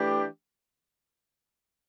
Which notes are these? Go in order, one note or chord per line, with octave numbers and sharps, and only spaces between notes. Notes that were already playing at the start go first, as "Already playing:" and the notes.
Already playing: E3 A3 D4 G4